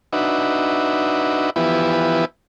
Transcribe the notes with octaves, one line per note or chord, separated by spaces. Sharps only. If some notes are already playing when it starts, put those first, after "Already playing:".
D4 D#4 F#4 B4 E5
E3 F3 B3 E4 G4 B4